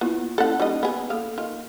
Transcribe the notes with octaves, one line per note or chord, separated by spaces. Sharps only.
A#3 B3 E4 F4
A#3 C#4 E4 A4 F#5
G3 C#4 D#4 D#5
B3 G#4
A#3 G#4 A4 F5
D#3 F4